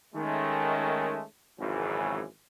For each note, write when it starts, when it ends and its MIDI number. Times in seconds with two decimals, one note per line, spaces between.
0.15 1.23 51
0.15 1.23 56
0.15 1.23 57
0.15 1.23 61
1.60 2.23 32
1.60 2.23 42
1.60 2.23 49
1.60 2.23 52